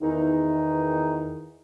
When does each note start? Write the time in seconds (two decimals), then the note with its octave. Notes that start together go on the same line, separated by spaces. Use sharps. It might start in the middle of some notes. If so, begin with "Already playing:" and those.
0.02 E2 D#3 D#4